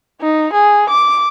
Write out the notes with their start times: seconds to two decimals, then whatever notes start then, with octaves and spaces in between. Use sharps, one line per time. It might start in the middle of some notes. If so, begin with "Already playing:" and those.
0.21 D#4
0.53 G#4
0.89 D6